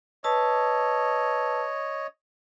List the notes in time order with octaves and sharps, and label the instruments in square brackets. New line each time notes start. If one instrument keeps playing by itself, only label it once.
[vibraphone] B4 A5 E6 [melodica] C#5 D#5